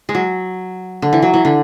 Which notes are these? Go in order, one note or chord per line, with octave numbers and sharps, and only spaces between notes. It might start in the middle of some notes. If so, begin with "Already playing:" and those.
G#3
F#3
D3
E3
F#3
E3
D3